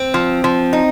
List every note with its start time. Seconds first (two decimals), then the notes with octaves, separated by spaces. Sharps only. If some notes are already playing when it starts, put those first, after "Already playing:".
Already playing: C4
0.14 F3
0.44 F3
0.73 D#4